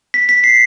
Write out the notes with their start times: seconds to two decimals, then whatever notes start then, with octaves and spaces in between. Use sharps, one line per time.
0.14 B6
0.29 B6
0.44 C7